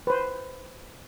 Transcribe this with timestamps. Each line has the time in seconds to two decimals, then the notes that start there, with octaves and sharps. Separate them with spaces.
0.07 B4 C5